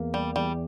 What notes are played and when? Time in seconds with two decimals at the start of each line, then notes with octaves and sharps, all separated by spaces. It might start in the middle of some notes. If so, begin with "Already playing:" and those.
Already playing: E2 A#3
0.14 G3
0.36 E2 G3